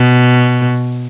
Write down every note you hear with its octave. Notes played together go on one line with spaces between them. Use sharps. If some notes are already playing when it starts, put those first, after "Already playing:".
Already playing: B2